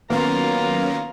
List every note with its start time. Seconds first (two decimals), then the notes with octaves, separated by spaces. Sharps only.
0.10 D#3 F#3 A#3 B3 C#4 F4 A#5